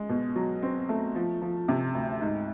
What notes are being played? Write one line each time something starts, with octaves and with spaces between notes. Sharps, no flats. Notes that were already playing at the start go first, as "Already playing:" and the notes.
Already playing: G#3
B2
F#3
C4
A3
F3
F3
C3
D2
G#2